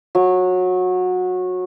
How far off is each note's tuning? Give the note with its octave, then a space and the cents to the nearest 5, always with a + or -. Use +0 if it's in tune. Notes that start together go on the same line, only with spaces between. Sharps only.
F#3 -20